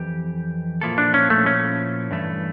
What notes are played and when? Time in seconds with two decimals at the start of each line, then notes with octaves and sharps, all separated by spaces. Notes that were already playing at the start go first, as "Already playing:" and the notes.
Already playing: F2 E3 G4
0.81 A#2 F3 A#3 E4 A4
0.98 D4
1.14 C#4
1.30 A3
1.46 C#4
2.11 G2 E3 A3